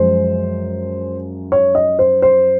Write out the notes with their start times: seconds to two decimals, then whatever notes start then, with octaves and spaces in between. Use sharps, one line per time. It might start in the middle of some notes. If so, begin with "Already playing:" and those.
Already playing: F#2 F3 G#3 C5
1.52 C#5
1.75 D#5
1.99 C5
2.22 C5